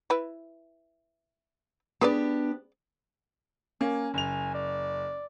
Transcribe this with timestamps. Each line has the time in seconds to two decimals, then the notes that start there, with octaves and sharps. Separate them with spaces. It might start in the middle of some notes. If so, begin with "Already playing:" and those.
0.10 E4 B4
2.01 B3 D4 G4 G#4 B4 D5
3.81 A#3 C#4 G#5
4.14 F#1 G#5 F7
4.54 D5